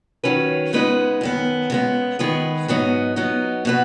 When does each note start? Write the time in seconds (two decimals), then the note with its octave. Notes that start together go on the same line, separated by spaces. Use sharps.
0.24 D#3 F#3 C#4 B4
0.73 C#3 G#3 B3 D#4 B4
1.21 F#2 D#3 B3
1.70 C#3 G#3 B3
2.19 D#3 G#3 B3 G#4 B4
2.68 G#2 F#3 B3 D#4
3.16 F#3 B3 D#4
3.65 B2 B3 F#4 B4